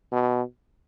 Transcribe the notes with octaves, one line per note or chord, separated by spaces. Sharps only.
B2